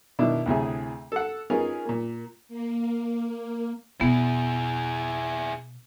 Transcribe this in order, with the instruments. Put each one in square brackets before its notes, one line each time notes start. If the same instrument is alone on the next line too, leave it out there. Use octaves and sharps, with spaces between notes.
[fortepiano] B2 D#3 D4 E4
D2 A2 C3 G#4
A4 F#5
C#4 D#4 F4 G#4 A#4 B4
A#2 A#3
[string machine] A#3
[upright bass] B2 [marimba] B3 [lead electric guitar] E4 G#4